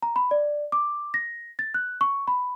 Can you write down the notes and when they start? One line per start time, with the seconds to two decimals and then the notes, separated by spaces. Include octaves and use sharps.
0.02 A#5
0.16 B5
0.31 D5
0.72 D6
1.14 A#6
1.59 A6
1.74 F#6
2.01 C#6
2.28 B5